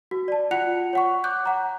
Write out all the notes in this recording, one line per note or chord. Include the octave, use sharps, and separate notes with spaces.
F#4
D5 A5
F4 F#5 F#6 C#7 F7
C#5 F#5 C#6
D6 F#6 G6
F#5 A#5